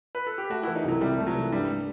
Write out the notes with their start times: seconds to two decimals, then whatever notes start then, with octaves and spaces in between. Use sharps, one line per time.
0.15 B4
0.27 A4
0.38 G4
0.50 A3 F#4
0.63 E4
0.67 E3
0.76 D#4
0.84 C2 F#3
1.01 C3 G3
1.18 A3
1.27 F#3
1.35 E3
1.52 G2 G3
1.69 A3